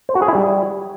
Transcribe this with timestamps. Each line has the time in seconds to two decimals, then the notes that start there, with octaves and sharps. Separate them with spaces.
0.09 C5
0.15 F#4
0.22 G#4
0.28 E4
0.35 G3